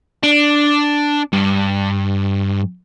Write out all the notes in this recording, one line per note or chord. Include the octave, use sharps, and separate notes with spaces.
D4
G2